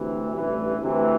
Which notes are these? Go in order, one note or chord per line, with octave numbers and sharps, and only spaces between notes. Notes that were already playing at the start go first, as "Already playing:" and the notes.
Already playing: D2 C3 E3
A1 G2 E3
D2 C3 E3